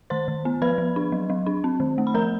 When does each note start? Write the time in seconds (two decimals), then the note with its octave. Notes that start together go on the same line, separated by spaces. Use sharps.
0.10 D#3 C5 C6
0.28 D#3
0.45 B3
0.62 F3 B4 B5
0.78 F3
0.96 D4
1.12 F#3
1.30 F#3
1.46 D4
1.64 C4
1.80 D#3
1.98 A3
2.07 B5
2.14 F3 A#4 A#5